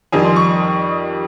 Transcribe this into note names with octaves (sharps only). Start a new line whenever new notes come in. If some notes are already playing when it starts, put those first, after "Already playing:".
F2 D#3 G3 G#5
C6
C#6